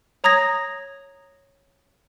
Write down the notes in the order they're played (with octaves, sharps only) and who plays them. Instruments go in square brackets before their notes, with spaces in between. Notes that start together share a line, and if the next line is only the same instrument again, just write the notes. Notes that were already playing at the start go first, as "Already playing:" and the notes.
[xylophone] C#5 A#5 D#6 G#6 A#6